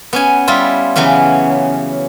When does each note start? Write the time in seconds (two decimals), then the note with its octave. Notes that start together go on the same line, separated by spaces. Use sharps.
0.13 B3 C#4 G#5
0.48 G3 E4 F4
0.96 C#3 E3 F#3 B3 C#4